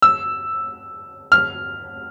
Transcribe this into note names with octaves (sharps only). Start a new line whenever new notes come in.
E6
F6